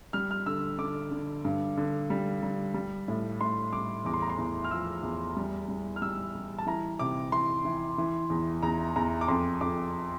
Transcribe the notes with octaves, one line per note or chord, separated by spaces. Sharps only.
G3 F6
F6
D3 E6
D3 D6
D3
G2
D3
G3
G3
G3
A2
A2 C6
G3 D6
E2 D6
C6
A#5
C6
E2
F6
F3 E6
E2
G3
G3
F6
G3 E6
G3
A5
E3 A#5
C3 D6
E3 C6
E3
E3
E2
E2 A#5
E2 A#5
D6
F2 C6
F2 D6